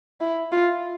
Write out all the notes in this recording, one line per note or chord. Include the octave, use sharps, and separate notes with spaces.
E4
F4